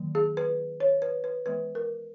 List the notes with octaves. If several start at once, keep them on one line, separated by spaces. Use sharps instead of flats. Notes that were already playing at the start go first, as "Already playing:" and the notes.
Already playing: D#3 F#3 A#3
G#4
B4
C#5
B4
B4
E3 G#3 B3 B4
A#4